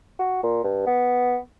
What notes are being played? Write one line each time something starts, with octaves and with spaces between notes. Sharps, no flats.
F#4
A#2
G2
B3